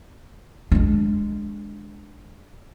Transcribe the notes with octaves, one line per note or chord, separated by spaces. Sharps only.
G#3 D4